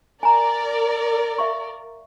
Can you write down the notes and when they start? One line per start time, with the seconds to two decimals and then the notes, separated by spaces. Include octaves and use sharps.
0.23 A#4 D5 G#5 A#5
1.38 E5 F5 C#6